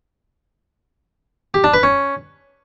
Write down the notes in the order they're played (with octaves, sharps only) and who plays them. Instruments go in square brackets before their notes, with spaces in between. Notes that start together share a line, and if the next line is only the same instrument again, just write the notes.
[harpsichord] G4
D4
B4
C#4